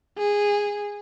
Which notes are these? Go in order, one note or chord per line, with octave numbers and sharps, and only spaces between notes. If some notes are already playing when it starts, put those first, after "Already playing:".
G#4